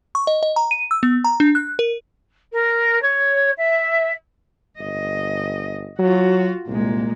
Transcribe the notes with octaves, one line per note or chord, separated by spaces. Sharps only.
C#6
D#5
D#5
A#5
D#7
E6
B3
A#5
D4
F#6
A#4
A#4
C#5
E5
G1 D#5
F#3 F4 F#4
C2 A#2 G#3